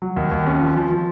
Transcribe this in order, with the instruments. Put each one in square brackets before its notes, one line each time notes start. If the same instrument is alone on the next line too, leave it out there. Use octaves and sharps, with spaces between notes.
[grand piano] F#3
D#2
D#2
C#4
F3
F3
F3